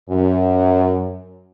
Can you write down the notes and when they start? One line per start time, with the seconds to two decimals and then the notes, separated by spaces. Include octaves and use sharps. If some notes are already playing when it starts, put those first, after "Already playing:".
0.10 F#2